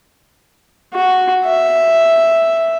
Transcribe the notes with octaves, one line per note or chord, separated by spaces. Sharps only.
F#4
E5